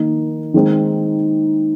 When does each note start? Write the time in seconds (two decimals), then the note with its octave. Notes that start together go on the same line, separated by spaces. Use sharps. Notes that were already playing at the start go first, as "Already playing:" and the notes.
Already playing: D#3 A#3 D#4
0.54 D#3 G#3 C4 D#4